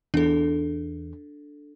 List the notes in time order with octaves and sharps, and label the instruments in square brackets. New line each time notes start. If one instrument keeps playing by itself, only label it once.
[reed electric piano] E2 [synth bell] D4 A4